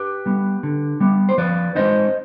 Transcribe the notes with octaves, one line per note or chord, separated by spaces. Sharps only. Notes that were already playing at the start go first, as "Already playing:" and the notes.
Already playing: G4 B4
G3 B3
D3
G3 B3
C5
F3 B4 D5
G#3 C4 D#4 C5 D#5